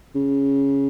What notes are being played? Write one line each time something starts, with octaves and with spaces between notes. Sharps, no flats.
C#3